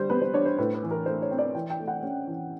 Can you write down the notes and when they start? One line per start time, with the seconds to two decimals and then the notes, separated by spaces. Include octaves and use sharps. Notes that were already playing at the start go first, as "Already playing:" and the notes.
Already playing: D3 G3 C5
0.10 B3 B4
0.21 C5
0.34 D4 C#5
0.45 C5
0.58 A2 B4
0.75 B4
0.83 E3
0.91 A#4
1.06 A3 C5
1.22 C#5
1.31 C4
1.38 D5
1.55 E3 G5
1.70 G5
1.80 A3
1.88 F#5
2.03 C#4
2.27 E3